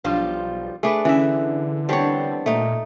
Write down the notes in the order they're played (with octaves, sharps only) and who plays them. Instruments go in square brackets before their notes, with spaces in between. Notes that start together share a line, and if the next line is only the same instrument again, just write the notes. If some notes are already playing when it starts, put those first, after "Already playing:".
[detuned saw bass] B1 [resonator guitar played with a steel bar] F3 G3 F4 [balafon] D4
[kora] A3 D4 B4 [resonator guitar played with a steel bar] G#4
[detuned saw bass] D3 [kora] E3 E5 [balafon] C#4
[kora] G3 C#5 [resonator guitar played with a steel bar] B3 C4 D4 [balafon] F#5
[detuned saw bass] A#2 [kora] A3 D#4